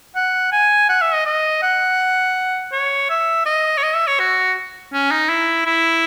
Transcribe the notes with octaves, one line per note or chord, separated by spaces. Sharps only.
F#5
G#5
F#5
E5
D#5
D#5
F#5
C#5
E5
D#5
C#5
D#5
E5
C#5
F#4
C#4
D#4
E4
E4